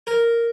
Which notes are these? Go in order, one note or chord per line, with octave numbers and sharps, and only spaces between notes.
A#4